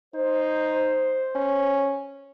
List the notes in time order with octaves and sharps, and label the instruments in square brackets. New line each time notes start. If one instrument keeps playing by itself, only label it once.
[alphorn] D#4 [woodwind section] C5
[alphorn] C#4